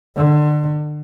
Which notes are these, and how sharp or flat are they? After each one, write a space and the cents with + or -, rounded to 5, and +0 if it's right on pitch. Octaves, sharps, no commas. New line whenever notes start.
D3 +30